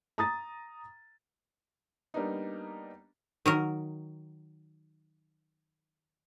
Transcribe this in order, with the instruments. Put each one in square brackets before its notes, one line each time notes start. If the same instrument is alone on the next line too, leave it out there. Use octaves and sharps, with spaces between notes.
[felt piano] A#5 D#6 A6
G3 A#3 B3 D4 D#4
[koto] D#3 F#3 A#4